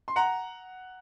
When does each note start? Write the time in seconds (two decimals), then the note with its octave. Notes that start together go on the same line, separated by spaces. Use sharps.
0.08 C6
0.16 F#5 A#5